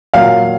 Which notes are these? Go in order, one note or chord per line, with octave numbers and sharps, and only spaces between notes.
A#2 F#3 A#3 F5